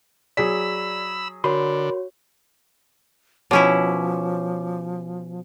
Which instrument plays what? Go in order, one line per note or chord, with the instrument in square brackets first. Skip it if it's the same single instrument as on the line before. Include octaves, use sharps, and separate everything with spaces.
[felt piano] F#3 G#4 B6 [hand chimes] D5 [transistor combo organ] B5 E6
[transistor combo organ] D3 [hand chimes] F#4 C#5 [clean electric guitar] A#4 B5 C6
[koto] B2 C#4 E4 [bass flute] F3 [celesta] C#5 D6